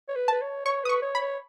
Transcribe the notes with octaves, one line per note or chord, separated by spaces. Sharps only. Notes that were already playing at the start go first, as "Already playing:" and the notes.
C#5
B4
B4 A5
C#5
C#5 C#6
B4 D#6
C#6
C#5
B5
C#5